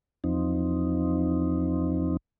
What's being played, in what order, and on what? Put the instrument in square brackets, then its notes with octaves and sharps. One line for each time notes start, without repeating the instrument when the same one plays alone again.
[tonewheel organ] E2 F3 C4 D#4